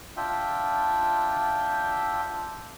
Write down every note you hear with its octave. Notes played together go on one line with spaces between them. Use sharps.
D4 F4 E5 G5